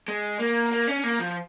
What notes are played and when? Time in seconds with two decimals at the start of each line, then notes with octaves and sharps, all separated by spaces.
0.08 G#3
0.39 A#3
0.72 A#3
0.88 C#4
1.04 A#3
1.20 F3